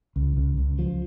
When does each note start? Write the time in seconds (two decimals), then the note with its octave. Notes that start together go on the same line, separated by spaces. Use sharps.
0.16 C#2
0.37 C#2
0.58 C#2
0.79 F3